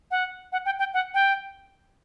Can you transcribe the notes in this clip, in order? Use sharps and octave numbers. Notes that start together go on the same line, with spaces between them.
F#5
F#5
G5
G5
F#5
G5